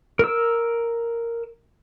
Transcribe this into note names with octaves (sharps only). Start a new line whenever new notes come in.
A#4 E6